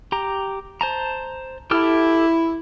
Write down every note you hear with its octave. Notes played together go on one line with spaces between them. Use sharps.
G4 A#5
C5 A5 A#5
E4 G4 A4 F6